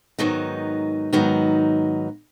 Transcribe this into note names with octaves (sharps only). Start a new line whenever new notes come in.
G#2 D#3 F#3 B3 D#4
G#2 D#3 F#3 B3 D#4